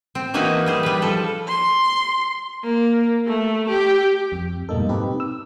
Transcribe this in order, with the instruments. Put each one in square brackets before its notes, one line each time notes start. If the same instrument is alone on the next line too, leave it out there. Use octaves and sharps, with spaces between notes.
[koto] C4
E3 A#3 D#4 F#4 B4 G#5
G3 G#4 C5
G3 B4
F3 A4
[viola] C6
A#3
A3
G4
[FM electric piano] F2
G#2 B2 G3 A#3 D#4 A4
C4 D#4 G4 B4
E6